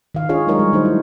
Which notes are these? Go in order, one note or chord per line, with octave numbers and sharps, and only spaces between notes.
D#3 F5
D4 F4 G#4 C#5 D#5
F#3 G#3 D#4 A#4 C#5 D#5
G3
D#3 A3 D4 D#4 F#4 C5
E4